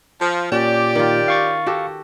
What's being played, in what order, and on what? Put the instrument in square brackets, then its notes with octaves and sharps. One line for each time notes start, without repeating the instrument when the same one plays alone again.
[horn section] F3
[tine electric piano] A#2 [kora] C#4 [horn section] G4 D5
[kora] D#3 F4
[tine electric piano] F5 C#6 A6
[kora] F#4 G4 A4